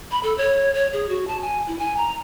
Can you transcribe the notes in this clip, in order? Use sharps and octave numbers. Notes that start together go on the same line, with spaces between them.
B5
A4
C#5
C#5
G#4
F#4
A5
G#5
E4
G#5
A#5